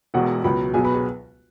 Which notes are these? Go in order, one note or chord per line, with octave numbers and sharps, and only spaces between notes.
E1 E2 B2 G#3 F#4 F#5
C#2 B2 F#3 B4 B5
B1 B2 F#3 G#4 G#5
B4 B5
G#4